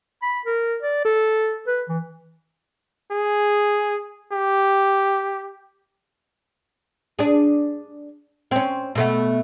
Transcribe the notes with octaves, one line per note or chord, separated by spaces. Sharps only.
B5
A#4
D5
A4
B4
E3
G#4
G4
D4 G#4
C4 C#4
B2 A3 B3